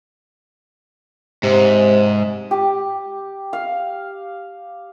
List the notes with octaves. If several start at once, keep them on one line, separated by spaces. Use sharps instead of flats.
G#2 C3
G4
F5